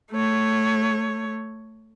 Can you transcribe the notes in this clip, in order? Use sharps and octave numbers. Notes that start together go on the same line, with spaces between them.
A3 C#5